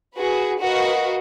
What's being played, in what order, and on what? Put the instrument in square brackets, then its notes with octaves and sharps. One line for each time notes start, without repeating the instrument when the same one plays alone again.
[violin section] F#4 G#4 B4
F#4 A#4 B4 D#5 F5